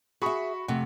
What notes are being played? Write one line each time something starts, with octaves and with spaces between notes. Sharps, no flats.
F#4 G#4 E5 B5 C#6
F2 C3 A3 F#5